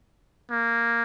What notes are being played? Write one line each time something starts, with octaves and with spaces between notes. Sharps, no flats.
A#3